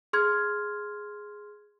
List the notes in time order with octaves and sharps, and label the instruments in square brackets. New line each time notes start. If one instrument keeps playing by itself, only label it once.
[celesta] G#4 C6 F6 G#6